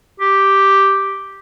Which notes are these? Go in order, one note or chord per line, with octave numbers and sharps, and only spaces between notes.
G4